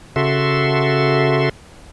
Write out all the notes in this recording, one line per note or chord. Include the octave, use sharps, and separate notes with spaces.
C#3 F#4 A4 E5 C6